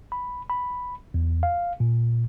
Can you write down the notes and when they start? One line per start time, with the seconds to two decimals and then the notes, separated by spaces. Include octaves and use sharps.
0.12 B5
0.50 B5
1.14 E2
1.43 F5
1.80 A#2